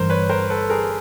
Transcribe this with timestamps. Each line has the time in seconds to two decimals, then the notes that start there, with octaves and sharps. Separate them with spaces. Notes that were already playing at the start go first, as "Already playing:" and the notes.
Already playing: G1 G2 E3 A#4 C5
0.10 B4 C#5
0.30 A#4 C5
0.50 A4 B4
0.70 G#4 A#4